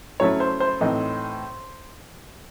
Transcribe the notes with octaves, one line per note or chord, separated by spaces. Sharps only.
F#3 A3 C#4 E4 C#5
C5
C5
A2 E3 C4 D#4